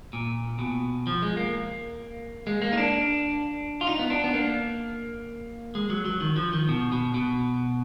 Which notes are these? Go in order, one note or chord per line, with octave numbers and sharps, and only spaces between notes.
A#2
B2
F3
G#3
A#3
G#3
A#3
D#4
D4
F4
D#4
B3
D4
B3
A#3
G#3
F#3
F#3
D#3
F3
D#3
B2
B2
B2